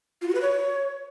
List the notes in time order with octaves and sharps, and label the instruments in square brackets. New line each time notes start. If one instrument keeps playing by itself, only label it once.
[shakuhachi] F4
F#4
B4
C#5